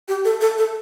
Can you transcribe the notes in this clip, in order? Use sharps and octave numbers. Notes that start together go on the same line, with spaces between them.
G4
A4
A4
A4